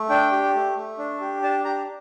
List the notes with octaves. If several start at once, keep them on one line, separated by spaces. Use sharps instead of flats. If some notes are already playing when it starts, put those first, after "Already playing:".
Already playing: A3
D4 G5
G4
A3
A3
D4
G4
D4 A5
G4 A#5